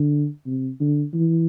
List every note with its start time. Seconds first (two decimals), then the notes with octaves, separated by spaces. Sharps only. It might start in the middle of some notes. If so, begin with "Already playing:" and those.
Already playing: D3
0.46 C3
0.80 D3
1.13 E3